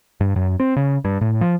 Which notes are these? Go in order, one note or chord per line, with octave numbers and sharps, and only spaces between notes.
G2
F#2
C4
C#3
G2
A2
F3